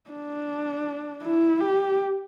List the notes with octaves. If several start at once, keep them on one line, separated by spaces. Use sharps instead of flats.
D4
E4
G4